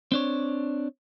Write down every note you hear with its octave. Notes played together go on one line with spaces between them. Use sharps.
C4 D4 C#5